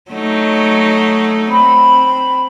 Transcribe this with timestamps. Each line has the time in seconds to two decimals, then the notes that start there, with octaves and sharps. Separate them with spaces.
0.11 F#3 A3 D#4
1.51 C4 B5